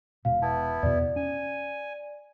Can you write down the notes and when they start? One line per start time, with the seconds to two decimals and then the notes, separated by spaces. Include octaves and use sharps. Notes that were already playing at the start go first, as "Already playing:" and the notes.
0.25 E1 B2 F5
0.42 B3 E4 A5
0.83 E2 B2 D5
1.16 C#4 G#5